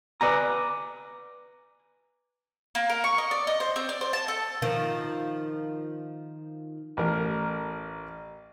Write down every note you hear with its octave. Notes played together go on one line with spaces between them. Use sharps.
B4 D5 G#5 A#5
A#3
A#4
C#6
D#5
D5
D#5
C5
C4
D5
C5
A5
A4
D#3 F3
A1 A#4